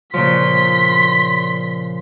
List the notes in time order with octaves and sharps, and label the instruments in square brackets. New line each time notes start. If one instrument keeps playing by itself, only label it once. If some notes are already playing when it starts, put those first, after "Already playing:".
[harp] A#2 C#3 F3 [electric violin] C6 B6